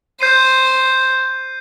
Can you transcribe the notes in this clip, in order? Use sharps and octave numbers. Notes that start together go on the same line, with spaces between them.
C5 G6 C7 D#7